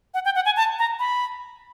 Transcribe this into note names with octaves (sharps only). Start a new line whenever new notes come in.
F#5
G5
F#5
G#5
A5
A#5
B5